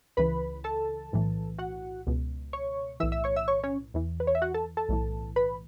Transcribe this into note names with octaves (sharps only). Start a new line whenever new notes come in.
C#2 C#3 E3 B4 B5
A4 A5
B1 A2 E3
F#4 F#5
C#2 B2
C#5 C#6
B1 A2 E3 E5 E6
E5 E6
C#5 C#6
E5 E6
C#5 C#6
C#4 C#5
E2 E3
B4
C#5
E5
F#4 F#5
A4 A5
A4 A5
B1 A2 E3
B4 B5